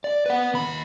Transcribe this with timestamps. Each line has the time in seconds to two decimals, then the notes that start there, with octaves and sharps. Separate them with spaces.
0.04 D5
0.26 B4 F#5
0.54 D#2 B5